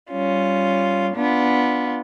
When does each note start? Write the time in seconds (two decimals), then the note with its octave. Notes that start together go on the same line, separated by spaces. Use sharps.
0.10 G3 C#4 F4
1.15 B3 D4 F4